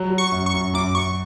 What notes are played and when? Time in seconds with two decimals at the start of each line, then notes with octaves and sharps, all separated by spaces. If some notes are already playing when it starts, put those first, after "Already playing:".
Already playing: F#3
0.10 F#3
0.18 C#6
0.32 F#2
0.46 C#6
0.54 F#2
0.74 F#2 D6
0.95 F#2 C#6